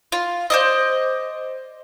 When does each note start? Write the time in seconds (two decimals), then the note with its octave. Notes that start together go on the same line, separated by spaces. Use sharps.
0.12 F4
0.50 C5 D5 D#5